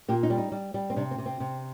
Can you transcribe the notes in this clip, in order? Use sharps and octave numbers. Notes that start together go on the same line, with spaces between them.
A#2 G4
D#4
G3
D#4
G3
G3
C4
C3 D4
C4
C3
C4
C3